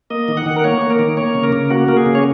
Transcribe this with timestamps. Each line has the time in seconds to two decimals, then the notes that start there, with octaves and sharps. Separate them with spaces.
0.10 A#3 D#5
0.28 D#3
0.37 F#5
0.46 D#3
0.56 A#4
0.64 A#3 C#5
0.82 A#3
0.90 A#4
0.99 D#3
1.17 A#3 C#5
1.35 C#3
1.44 A#4
1.52 C#3
1.70 A#3 F#4
1.88 A#3 A#4
1.97 G#4
2.06 C#3
2.15 C#5